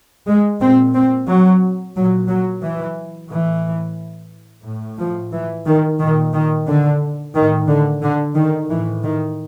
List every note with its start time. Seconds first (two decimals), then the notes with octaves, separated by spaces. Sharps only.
0.26 G#3
0.60 A#2 C4
0.94 C4
1.28 F#3
1.95 A#2 F#3
2.29 F#3
2.63 E3
3.30 A2 E3
4.65 A2
4.99 F3
5.32 E3
5.66 D#3
6.00 A#2 D#3
6.33 D#3
6.67 D3
7.34 A2 D#3
7.68 D3
8.02 D3
8.35 D#3
8.69 A2 E3
9.03 D#3